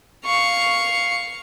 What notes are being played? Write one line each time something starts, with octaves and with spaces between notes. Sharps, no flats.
F5 C#6